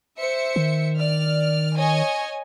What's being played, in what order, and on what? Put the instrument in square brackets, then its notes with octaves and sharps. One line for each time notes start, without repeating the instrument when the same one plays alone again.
[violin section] C5 E5 C#7
[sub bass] D#3
[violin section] D5 F6
C#5 D#5 G#5